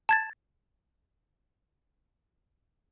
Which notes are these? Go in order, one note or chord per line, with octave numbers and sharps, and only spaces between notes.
A5 G#6 A6